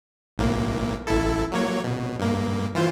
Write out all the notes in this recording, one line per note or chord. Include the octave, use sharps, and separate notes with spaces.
B1 A2 A#3
A1 E4 A4
F#3 A#3 C#5
B2
G2 A#3
E3 F4 C5